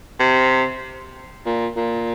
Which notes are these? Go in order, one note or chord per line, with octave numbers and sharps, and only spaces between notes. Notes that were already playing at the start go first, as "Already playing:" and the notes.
C3
A#2
A#2